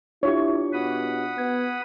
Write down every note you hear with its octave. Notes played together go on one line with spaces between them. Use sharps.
D4 E4 F4 G4 C#5
B2 F#5 B5 D#6
B3 G#6